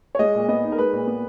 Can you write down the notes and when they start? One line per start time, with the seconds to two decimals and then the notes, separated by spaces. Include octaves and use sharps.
0.15 C#5
0.19 G#3 D#5
0.35 A#2
0.48 B3 D#5
0.64 D#4
0.72 A#4
0.78 G#3 B4
0.93 A#2
1.07 B3